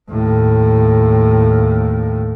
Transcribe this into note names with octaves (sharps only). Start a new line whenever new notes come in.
D#2 A2